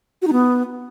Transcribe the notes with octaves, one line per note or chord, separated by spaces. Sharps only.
F#4
D#4
B3